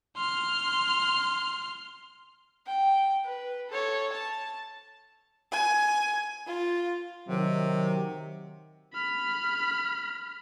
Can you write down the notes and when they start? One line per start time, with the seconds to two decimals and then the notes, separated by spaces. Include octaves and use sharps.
0.17 C6 F6
2.67 G5
3.25 B4
3.70 A4 C#5
4.13 A5
5.52 G#5
6.47 F4
7.28 C3 D#3 F#3
8.93 B5 F6